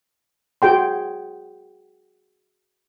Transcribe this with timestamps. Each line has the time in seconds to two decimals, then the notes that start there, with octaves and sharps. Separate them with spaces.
0.62 F#4 G#4 G5 C6